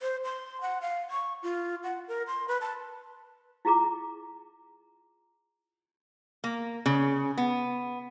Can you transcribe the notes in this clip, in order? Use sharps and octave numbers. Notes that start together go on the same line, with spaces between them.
C5
C6
F#5
F5
C#6
F4
F#5
A#4
C6
B4
A5
E4 F4 G#4 A#5 D6
A#3
C#3
B3